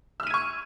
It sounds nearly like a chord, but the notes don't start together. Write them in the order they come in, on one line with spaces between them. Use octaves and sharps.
E6 F6 D#7 G#6 C#6